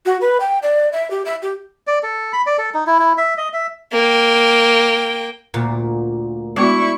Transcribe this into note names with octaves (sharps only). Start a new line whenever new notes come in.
F#4
B4
G5
D5
E5
G4
E5
G4
D5
A4
B5
D5
A4
D#4
E4
E4
E5
D#5
E5
A#3 G5
D2 A#2
G#3 B3 D4 E4 F#4 C#6